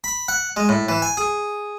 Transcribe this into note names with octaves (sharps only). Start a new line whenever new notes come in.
B5
F#5
G#3
A2
E3
G#5
G#4